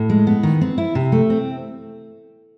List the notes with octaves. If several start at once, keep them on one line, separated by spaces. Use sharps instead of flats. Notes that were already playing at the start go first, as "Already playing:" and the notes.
Already playing: A2
G#3
B3
D#3
C4
E4
C3
A3
C4